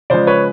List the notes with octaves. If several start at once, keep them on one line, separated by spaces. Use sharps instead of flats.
C#3 F3 G#3 C5 D5
B4 C#5